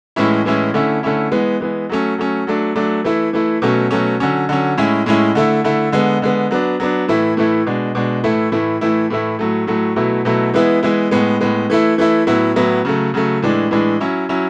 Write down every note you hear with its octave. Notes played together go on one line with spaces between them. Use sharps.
A2 E3 G#3 C#4 E4
A2 E3 G#3 C#4 E4
D3 A3 C#4 E4
D3 A3 C#4 E4
E3 G#3 B3
E3 G#3 B3
F#3 A3 C#4
F#3 A3 C#4
F#3 A3 D4
F#3 A3 D4
E3 A3 E4
E3 A3 E4
B2 F#3 A3 C#4
B2 F#3 A3 C#4
D3 F#3 C#4
D3 F#3 C#4
A2 G#3 C#4 E4
A2 G#3 C#4 E4
D3 A3 E4
D3 A3 E4
D3 G#3 B3
D3 G#3 B3
F#3 B3 D4
F#3 B3 D4
A2 E3 A3 E4
A2 E3 A3 E4
B2 G#3 D4
B2 G#3 D4
A2 E3 A3 E4
A2 E3 A3 E4
A2 E3 A3 E4
A2 E3 A3 E4
A2 F#3 A3
A2 F#3 A3
B2 F#3 A3 E4
B2 F#3 A3 E4
E3 G#3 B3 E4
E3 G#3 B3 E4
A2 G#3 B3
A2 G#3 B3
E3 A3 E4
E3 A3 E4
A2 F#3 B3 E4
A2 F#3 B3 E4
C#3 F#3 A3
C#3 F#3 A3
A2 E3 G#3 D4
A2 E3 G#3 D4
F#3 C#4 E4
F#3 C#4 E4